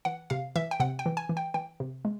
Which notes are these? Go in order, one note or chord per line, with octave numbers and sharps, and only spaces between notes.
E3 F#5
C3 F5
E3 E5
G5
C3 F#5
G5
E3
G#5
E3
G5
E3 G5
C3
G#3